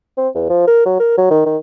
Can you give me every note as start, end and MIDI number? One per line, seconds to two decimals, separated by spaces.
0.17 0.29 60
0.35 0.45 40
0.49 0.63 53
0.67 0.84 70
0.86 0.95 54
1.00 1.13 70
1.18 1.28 54
1.31 1.41 51
1.46 1.57 51